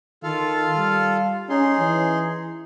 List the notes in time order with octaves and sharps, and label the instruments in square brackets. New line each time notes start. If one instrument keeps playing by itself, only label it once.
[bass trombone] D#3 [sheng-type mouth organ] F4 A4 F5
[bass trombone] G3
[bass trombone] C#4 [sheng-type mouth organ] D#4 G#4 C6
[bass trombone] E3